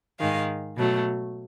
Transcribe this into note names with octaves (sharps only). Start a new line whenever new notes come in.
G#2 D#3 G#3 F5
B2 F#3 A3